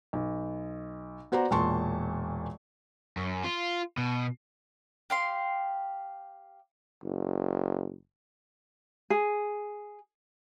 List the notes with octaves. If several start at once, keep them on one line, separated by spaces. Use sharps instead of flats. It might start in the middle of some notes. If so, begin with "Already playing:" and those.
B1
B3 F#4 C5 D5 A#5
E1 A#2 A5 C6 C#6
F#2
F4
B2
G4 F5 C6
F#1
G#4